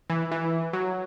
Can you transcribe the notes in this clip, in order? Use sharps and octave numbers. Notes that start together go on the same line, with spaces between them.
E3
E3
F#3